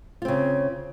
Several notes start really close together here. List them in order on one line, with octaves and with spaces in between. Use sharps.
F4 C4 C#3